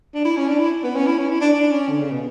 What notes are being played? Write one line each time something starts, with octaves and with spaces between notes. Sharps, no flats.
D4
E4
C#4
D4
E4
B3
C#4
E4
C#4
E4
D4
D4
C#4
D3
C#3
B2